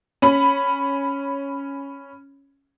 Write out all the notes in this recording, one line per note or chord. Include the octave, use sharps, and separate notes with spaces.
C#4 B5